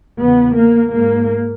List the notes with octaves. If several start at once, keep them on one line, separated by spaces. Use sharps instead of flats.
E2 C#3 B3
A#3
G#2 A#3